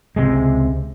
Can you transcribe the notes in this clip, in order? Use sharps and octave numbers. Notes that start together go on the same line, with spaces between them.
C#2 C3 G#3